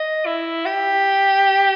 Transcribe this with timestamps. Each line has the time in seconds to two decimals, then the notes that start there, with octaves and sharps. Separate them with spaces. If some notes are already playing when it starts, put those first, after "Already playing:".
Already playing: D#5
0.26 E4
0.66 G4